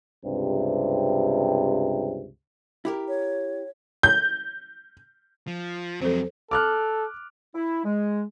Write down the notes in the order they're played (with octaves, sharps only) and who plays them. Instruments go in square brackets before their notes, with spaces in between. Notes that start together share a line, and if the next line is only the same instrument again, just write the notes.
[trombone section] C#2 G2 C3
[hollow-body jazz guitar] E4 G4 A#4
[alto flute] C#5
[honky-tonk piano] G6
[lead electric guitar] F3
[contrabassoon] F2 [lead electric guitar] F#3 G#3 [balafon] A4 C5
[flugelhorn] A4 [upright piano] D6 F6 F#6
[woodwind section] E4
G#3